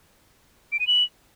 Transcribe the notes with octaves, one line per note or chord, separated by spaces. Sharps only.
D7
D#7
F#7